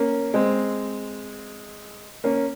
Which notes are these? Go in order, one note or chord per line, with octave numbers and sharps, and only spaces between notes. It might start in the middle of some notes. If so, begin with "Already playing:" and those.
Already playing: A#3 C#4
G#3 C4
A#3 C#4